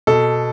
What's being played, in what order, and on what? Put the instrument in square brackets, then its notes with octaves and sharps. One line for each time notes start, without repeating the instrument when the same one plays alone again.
[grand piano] B2 A4